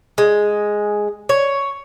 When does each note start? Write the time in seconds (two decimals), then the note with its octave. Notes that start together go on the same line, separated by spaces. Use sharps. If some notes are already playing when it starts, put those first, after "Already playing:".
0.18 G#3
1.29 C#5